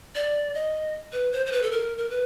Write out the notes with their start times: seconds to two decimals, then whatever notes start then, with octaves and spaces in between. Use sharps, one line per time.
0.15 D5
0.54 D#5
1.12 B4
1.32 C5
1.46 C5
1.52 B4
1.62 A4
1.71 A#4
1.98 A#4
2.10 B4